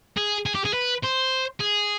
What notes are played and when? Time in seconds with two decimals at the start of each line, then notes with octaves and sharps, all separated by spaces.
0.17 G#4
0.46 G#4
0.55 G4
0.65 G#4
0.74 B4
1.03 C5
1.60 G#4